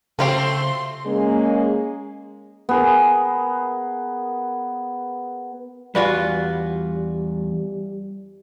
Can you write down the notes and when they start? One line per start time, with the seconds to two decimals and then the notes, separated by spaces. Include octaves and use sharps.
0.19 C#3 F#3 A3 C4 F4 G4 C6
1.06 G#3 A#3 C#4 G#4
2.69 B3 G#4 A#4
5.95 E2 G3 F4 F#4 B4 D5 G#5